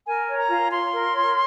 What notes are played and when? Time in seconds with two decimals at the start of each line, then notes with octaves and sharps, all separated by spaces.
0.07 A#4 G#5
0.29 C#5
0.39 A#5
0.50 F4
0.72 F4 C6
0.92 A#4
1.14 C#5